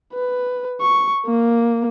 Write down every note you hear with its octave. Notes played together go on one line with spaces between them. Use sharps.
B4
C#6
A#3